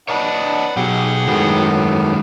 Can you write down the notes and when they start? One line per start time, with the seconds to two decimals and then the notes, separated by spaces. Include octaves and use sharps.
0.09 D4 B4 C#5 D#5 F#5 A5
0.77 B2 F#3 G4 G#4 F#5
1.27 F#2 A2 D#3 F#3 G#3 B3